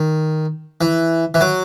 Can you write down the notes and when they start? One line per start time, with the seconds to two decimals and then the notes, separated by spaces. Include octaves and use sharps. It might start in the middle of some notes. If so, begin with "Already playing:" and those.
Already playing: D#3
0.81 E3
1.34 E3
1.41 F#3